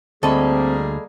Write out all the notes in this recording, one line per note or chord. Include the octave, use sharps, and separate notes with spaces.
D2 G3 A#3 C4 G#4 A4 D#5 B5